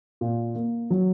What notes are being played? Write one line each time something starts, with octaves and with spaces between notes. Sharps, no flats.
A#2
A#3
F#3